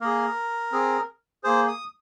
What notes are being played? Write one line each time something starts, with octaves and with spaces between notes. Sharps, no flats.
A#3 G#4 A#4
C4 G#4
A#3 G#4 C5
D#6